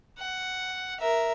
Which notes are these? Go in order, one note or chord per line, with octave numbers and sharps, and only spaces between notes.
F#5
A#4 E5